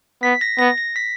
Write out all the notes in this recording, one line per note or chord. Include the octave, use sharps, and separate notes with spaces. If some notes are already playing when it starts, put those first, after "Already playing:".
B3 B6
A#6
B3 A#6
A#6
B6